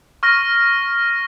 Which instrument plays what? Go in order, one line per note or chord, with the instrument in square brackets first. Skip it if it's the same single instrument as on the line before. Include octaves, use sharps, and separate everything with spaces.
[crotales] C#6 F6 A#6